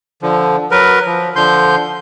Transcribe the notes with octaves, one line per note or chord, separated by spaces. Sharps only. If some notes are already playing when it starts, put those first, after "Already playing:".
D3 F3
F#3 A#4 B4
F3
D3 F3 C6 G6